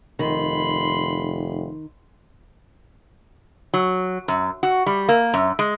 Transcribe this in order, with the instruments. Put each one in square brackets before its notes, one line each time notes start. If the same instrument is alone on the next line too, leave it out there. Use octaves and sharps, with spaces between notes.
[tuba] F1 [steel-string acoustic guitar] D#3 [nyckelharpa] B5 C6
[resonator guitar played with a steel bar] F#3
F#2
F#4
G3
A#3
F#2
G#3